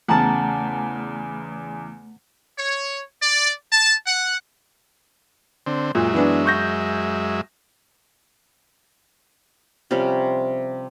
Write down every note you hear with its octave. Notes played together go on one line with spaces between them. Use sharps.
E2 C#3 A3 F#5 A5 A#5
C#5
D5
A5
F#5
D3 C4
F#2 A#2 G#3 E5
E3 B3 D4
C#6 G6 A#6
C3 F3 G3 C#4